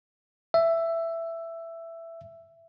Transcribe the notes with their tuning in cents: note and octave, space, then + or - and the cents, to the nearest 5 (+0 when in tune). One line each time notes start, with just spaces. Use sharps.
E5 +10